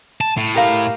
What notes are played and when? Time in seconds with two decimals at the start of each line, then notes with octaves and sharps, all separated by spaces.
0.21 A5
0.37 A2
0.55 G4 A#4 F5